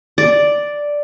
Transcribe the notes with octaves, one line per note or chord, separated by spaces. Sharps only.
D5